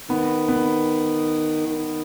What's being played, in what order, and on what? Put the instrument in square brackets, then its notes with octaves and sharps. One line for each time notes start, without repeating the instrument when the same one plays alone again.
[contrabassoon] D#3 [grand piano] B3
[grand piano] B3
[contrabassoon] D#3